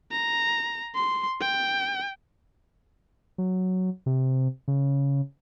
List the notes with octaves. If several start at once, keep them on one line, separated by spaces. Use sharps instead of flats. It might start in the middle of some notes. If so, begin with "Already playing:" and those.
A#5
C6
G5
F#3
C3
C#3